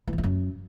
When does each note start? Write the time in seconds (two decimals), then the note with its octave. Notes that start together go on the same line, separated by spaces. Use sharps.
0.07 E3
0.13 F2
0.18 E2
0.24 F#2